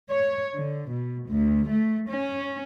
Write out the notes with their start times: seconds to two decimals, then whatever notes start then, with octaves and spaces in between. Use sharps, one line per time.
0.10 C#5
0.54 D3
0.90 B2
1.29 D2
1.68 A3
2.09 C#4